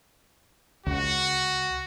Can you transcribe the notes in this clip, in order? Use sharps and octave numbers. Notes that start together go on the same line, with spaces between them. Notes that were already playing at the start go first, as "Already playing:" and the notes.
C#2 F#4